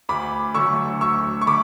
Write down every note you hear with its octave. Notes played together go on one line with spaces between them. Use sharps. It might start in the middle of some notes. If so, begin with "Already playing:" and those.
D2 B5 D6
D3 F#3 A3 C#6 E6
D2 C#6 E6
C#6
D3 B5 D6